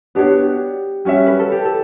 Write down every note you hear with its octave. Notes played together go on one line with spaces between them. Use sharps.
B3 D4 F#4 G4 C#5
G3 C#4 F#4 C#5 E5
B4
A4
G4
A4